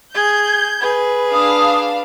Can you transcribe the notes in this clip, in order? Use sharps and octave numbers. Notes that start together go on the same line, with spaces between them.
G#4 G6 G#6
G#4 B4
D4 F5 D#6